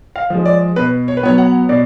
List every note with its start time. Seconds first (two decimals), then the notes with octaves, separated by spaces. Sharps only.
0.16 F5
0.30 F3 G#3
0.46 D5
0.76 B2 B4
1.08 C#5
1.17 B4
1.23 F#3 B3 C#5
1.38 F#5
1.69 B2 D5